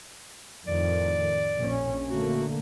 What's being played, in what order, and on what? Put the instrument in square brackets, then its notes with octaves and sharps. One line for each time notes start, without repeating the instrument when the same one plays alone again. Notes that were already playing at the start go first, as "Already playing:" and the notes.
[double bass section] F2 A2 D#3 [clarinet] D5
[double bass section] A#1 C#4
[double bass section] D3 A3 A#3 [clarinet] F#4